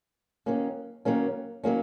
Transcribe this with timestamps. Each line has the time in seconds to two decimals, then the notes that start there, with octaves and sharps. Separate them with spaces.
0.46 D#3 F#3 A#3 C#4
1.05 D#3 F#3 A#3 C#4
1.64 D#3 F#3 A#3 C#4